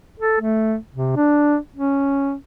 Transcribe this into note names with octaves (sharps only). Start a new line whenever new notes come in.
A4
A3
C3
D4
C#4